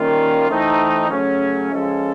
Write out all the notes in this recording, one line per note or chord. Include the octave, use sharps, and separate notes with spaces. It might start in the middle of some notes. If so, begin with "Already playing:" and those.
Already playing: D#3 G3 A#3 C#4 F4
E3 A3 C4 D#4
C#3 F#3 A3 C#4
F3 G#3 C#4 F4 A4